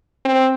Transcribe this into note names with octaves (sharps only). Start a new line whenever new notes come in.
C4